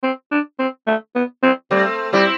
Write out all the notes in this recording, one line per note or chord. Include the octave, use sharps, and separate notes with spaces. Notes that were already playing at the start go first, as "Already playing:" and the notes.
C4
D4
C4
A3
B3
C4
G3 A3 C4
G3 C4 E4